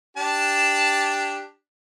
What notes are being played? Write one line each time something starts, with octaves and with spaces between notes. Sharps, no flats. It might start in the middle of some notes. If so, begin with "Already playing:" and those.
D4 G4 A5